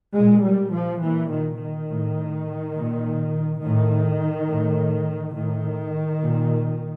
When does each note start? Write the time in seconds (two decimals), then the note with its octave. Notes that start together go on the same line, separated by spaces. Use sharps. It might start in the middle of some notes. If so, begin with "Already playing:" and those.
0.17 A#2 G#3
0.45 G3
0.74 F3
1.03 A#2 E3
1.32 D#3
1.60 D#3
1.89 A2
2.76 A#2
3.62 A2 D#3
4.49 A2
5.36 A2 D#3
6.22 A#2